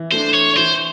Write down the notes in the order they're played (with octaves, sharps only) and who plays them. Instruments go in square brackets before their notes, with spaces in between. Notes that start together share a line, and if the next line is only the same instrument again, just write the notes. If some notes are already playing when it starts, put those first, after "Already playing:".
Already playing: [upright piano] E3
[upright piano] A3 D4 [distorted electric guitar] C5
[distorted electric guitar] C#5
[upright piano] E3 [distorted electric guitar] C5